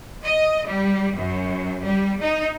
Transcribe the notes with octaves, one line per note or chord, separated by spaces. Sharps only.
D#5
G3
F#2
G3
D#4